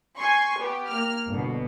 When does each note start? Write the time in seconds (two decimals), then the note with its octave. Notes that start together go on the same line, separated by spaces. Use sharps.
0.18 G#5 C6 C#6
0.59 B3 G4
0.89 A#3 F6
1.30 G1 B2